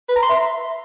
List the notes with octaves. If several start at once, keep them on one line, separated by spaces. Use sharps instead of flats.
B4
A#5
C6
E5